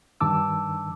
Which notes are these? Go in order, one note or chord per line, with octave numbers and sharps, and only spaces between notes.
G2 D#3 A5 D6 E6